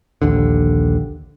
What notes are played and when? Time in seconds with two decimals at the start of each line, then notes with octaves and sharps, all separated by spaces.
0.22 A#1 D#2 D3